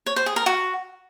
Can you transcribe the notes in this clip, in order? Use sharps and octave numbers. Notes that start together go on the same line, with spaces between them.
C#5
C5
G#4
A#4
F#4